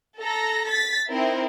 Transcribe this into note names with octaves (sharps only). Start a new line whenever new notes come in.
A4 A#5 A#6
A6 B6
C4 D#4 E4 A#4